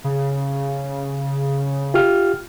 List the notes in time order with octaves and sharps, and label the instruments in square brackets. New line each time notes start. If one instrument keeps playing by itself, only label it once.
[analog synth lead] C#3
[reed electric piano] F4 G4 F6